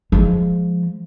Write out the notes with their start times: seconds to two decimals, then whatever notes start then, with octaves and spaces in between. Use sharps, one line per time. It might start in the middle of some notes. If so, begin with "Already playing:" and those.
0.12 F3 G#3